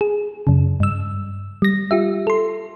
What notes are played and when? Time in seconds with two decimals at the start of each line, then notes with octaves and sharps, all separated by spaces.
0.01 G#4
0.47 F#2 C#3
0.80 G2 E6
1.62 G3 A#6
1.91 F4 G4 E5
2.27 A4 C6